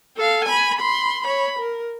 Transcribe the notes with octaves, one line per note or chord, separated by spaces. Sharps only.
A4 F5
G#5 B5
B5 C6
C#5 B5
A#4